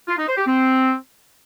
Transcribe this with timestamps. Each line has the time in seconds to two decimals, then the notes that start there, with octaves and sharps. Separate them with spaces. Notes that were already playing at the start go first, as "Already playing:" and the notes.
0.08 F4
0.18 D#4
0.27 C5
0.37 G4
0.46 C4